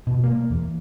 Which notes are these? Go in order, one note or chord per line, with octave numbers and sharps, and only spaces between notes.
B2
A#3
E2